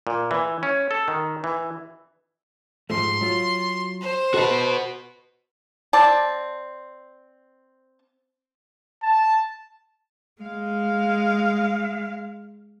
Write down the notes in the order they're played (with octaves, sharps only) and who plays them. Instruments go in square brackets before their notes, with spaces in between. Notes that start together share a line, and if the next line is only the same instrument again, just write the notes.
[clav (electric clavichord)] A#2
E3
C#4
A4
D#3
E3
[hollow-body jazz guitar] G#2 F3 A3 [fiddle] C6
[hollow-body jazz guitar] F#3 F4
[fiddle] C5
[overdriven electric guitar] F#4 B4 [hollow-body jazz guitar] A4 D#5 A5
[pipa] C4 D5 A5
[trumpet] A5
[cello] G#3 F5